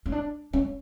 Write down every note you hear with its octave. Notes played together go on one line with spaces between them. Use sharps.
C#4
D4
C#4